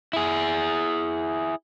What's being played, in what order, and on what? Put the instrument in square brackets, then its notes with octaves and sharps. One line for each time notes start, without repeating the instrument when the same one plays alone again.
[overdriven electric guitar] E4 G#4